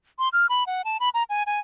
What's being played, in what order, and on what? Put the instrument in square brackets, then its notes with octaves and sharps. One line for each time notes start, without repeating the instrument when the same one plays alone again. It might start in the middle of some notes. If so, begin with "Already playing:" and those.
[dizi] C6
F6
B5
F#5
A5
B5
A#5
G#5
G#5